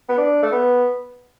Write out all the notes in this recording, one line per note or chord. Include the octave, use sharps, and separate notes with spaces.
B3
D4
A3
B3